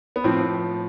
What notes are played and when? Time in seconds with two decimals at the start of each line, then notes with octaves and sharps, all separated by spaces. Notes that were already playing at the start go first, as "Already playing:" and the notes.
0.16 B3
0.24 A2 F3 C4